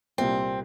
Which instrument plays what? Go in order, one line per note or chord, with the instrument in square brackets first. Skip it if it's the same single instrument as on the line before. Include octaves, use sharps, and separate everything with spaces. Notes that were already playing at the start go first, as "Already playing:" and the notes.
[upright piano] C2 A#2 G3 [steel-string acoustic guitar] C4